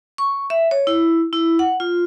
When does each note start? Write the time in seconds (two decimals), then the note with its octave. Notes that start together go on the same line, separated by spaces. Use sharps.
0.18 C#6
0.50 E5
0.71 C#5
0.87 E4
1.33 E4
1.59 F#5
1.80 F4